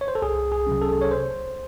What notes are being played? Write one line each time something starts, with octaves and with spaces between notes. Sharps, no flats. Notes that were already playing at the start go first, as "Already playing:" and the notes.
C#5
C5
A4
C2 G#4
G#4
C3 F#3 C#4
A4
C#5
C5